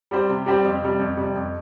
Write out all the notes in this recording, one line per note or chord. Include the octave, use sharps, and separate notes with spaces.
G3 C4 G4 C5
C3
G3 C4 G4 C5
F2
C3 G3
F2
C3 G3
F2